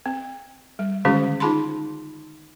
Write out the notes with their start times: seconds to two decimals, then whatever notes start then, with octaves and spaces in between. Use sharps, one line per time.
0.06 C4
0.79 G3
1.05 D3 D#3 G#3 C#4 F#4 G#4
1.40 D#4 F4 G#4 A5 B5 C6